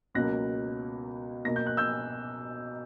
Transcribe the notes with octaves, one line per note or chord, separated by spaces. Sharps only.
C#2 B2 F#3 A#3 F#6 A#6
B2 A#3 A#6
G6
F#6
E6 G6